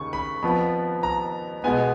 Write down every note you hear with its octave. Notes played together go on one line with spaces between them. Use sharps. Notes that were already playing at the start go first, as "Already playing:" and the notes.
Already playing: D#2 C#3 C#6
B5
F2 F3 B3 B5
A#5
B2 G#3 B3 G#5